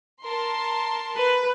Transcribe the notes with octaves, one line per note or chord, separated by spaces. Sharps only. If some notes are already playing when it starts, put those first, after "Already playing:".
A#4 A5 C6
B4